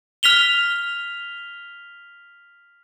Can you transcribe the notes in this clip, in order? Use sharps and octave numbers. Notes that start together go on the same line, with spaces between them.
F6 B6 F7 G7